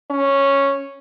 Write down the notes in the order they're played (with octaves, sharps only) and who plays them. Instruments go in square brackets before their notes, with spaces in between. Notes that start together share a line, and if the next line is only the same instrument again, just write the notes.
[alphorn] C#4